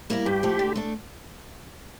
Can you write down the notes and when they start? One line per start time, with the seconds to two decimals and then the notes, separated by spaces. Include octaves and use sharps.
0.10 G3 A#3 E4 A#4
0.26 G2 G4
0.43 F3 A3
0.59 D3
0.76 A3 D4